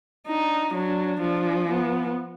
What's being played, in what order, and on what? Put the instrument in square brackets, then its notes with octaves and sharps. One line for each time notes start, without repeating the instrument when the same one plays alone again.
[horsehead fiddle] D4 [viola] D#4
[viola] F#3 [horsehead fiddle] D4
[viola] F3
[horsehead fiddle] B3